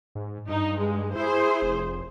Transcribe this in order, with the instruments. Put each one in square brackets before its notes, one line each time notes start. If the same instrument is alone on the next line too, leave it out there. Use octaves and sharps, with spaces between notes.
[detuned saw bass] G#2
[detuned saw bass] G2 [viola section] D#4
[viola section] G#3
[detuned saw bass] E4 [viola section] G#4 C5
[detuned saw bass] F1